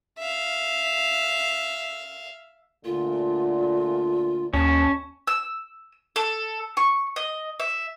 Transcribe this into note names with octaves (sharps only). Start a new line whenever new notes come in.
E5 F5
D2 A#2 D3 F4
D#2 C#4 A5
E6
A4
C#6
D#5
E5